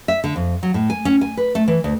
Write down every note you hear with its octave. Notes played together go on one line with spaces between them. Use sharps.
E5
D3
F2
F#3
A2
G#5
C#4
G#5
B4
A3
E3
D2